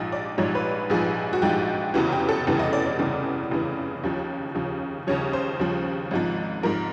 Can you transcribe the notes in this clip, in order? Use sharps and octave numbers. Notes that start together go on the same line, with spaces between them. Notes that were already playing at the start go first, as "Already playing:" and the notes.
Already playing: A#1 G#2 F3 D#5
D5
A#1 G#2 F3 C#5
B4
A#1 G#2 F3 G#4
F#4
A#1 G#2 F3 G4
F1 E2 C#3 E3 F#4
G4
A4
F1 E2 C#3 E3
D#5
D5
D5
F1 E2 C#3 E3
F1 E2 C#3 E3
D#2 C#3 F3
D#2 C#3 F3
D#2 C#3 F3 C#5
C5
D#2 C#3 F3
G#1 G#2 F3
G#2 F3 A#4